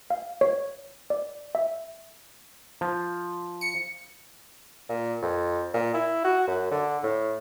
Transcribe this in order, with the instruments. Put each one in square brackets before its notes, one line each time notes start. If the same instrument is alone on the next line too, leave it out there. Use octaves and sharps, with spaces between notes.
[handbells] F5
C#5
D5
E5
[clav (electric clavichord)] F3
[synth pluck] C#7
[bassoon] A#2
F2
A#2
E4
F#4
F#2
D3
A2